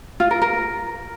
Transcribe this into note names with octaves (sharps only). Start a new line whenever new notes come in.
F4
A#4
A#4